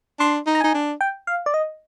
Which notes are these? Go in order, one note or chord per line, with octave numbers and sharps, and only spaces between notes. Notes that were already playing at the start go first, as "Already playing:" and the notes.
D4 C6
D#4
A#5
D#4 G#5
D4
G5
F5
D5
D#5